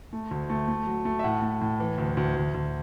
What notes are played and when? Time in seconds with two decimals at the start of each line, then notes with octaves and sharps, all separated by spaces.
0.13 A3
0.31 D2
0.50 A3
0.68 A3
0.87 F#3
1.05 A3
1.19 E5
1.24 A2 F#5
1.42 A3
1.61 A2
1.80 E3
1.98 D2
2.17 D2
2.36 D2
2.54 D2